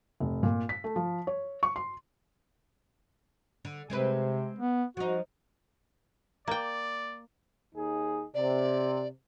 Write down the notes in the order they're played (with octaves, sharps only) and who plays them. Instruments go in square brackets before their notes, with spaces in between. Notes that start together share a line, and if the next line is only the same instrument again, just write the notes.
[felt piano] F1
A#2
B6
A3
F3
C#5
C#6
C6
[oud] D3
[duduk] C3 [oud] G#3 C4 B4
[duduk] B3
[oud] F3 D#4 [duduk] F#4
[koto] A#3 G5 [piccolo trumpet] D5
[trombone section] D#2 D#4 G#4
[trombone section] C3 [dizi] D5